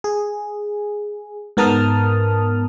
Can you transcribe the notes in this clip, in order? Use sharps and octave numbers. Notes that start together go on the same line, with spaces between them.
G#4
G#2 B3 A#4 A5 D#6 F6